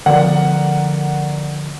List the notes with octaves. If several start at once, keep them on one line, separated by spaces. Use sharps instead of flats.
D3 F3 B3 A#4 D5 F#5